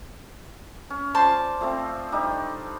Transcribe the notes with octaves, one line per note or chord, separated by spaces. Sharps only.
C#4
F4 C5 D5 A5 C6
F3 A3 C4
G3 D4 D#4